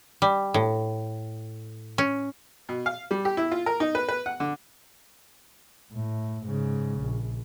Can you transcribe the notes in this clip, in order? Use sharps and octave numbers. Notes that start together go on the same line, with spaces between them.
G3
A2
C#4
B2
F5
G3
G4
E4
F4
A#4
D#4
B4
B4
F#5
D3
A2
G#2 C#3
A#1